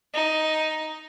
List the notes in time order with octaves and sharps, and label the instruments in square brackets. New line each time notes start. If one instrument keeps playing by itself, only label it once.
[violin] D#4